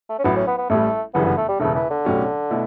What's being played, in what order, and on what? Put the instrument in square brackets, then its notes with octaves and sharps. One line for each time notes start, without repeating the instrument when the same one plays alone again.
[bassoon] A3
C#4
[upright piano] A1 A2 F#3 [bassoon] B3
[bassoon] C#4
B3
B3
[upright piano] A1 A2 G3 [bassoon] A3
[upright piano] G1 F#2 C#3 E3 G3 [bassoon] B3
[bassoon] B3
A3
G3
[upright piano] E1 E2 C#3 [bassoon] A3
[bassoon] E3
D3
[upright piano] B1 A2 F#3 C#4 G4
B2 A3 E4